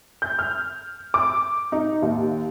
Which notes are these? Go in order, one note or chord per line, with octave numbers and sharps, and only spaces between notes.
G6
F6
D6
D#4
D#2